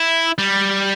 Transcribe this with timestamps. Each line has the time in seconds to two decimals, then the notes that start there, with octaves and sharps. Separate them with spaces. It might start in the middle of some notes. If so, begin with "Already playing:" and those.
Already playing: E4
0.38 G3